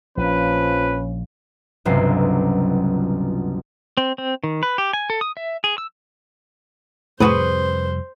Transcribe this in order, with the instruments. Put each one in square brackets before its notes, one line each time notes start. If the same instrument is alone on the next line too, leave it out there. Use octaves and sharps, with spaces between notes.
[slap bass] A#1 [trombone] F3 [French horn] C#4 [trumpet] B4
[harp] G1 C#2 C3 F#3 C7
[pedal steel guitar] C4
C4
D#3
B4
G4
G#5
A4
D#6
E5
G#4
E6
[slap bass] F2 C3 G3 [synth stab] A2 [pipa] F#4 G#4 B4 [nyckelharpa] C5